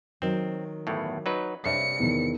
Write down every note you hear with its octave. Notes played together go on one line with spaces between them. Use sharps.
D#3 F#3 C4
G1 E2 A2
F#3 D#4 B4
G2 C3 C#5 D5 C#7
E2 D#3